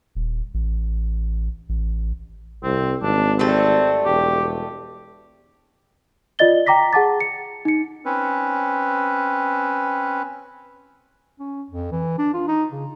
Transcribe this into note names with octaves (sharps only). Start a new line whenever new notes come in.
D#1
A1
A1
C2 C4
G#1 D4
G3 A3 C4 A4
E1 G4
F4 D5 D#5 A6 G7
G5 A#5 D6 A#6 B6
G#4 F#5 A5 D6 A6
C#7
D#4 C#7
C4 C#4 B4
C#4
F2
E3
D4
F4
D#4
C#3